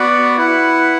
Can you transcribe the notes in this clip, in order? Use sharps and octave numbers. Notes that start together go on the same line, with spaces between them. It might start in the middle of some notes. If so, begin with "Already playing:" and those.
Already playing: B3 F#4 B4 D5 F#5
E4 B4 F#5